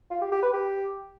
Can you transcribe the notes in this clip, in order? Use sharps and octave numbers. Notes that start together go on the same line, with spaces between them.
F4
G4
G4
B4
G4